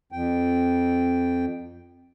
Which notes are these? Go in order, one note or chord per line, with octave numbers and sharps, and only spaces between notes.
F2 G5